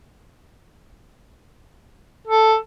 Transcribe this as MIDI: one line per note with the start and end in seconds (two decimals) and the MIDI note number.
2.27 2.55 69